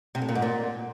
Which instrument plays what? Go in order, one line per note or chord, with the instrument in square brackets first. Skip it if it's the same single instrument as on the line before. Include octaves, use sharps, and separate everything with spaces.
[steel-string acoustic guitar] C3
A2
A#2
G#2
A#2